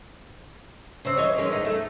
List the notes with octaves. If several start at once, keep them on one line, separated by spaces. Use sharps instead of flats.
C#3 C4
E3 C#5 D#5
D#3 G#3 C#4
E2 D#4
A3